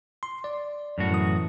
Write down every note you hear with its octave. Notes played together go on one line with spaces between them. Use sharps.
C6
D5
F#2 A2 F#4
E3 D#6